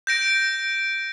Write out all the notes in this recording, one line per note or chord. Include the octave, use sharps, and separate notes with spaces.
G6 A#6 D7